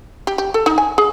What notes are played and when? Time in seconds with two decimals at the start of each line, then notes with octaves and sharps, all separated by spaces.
0.27 G4
0.38 G4
0.54 A4
0.66 D#4
0.78 G#5
0.98 G#4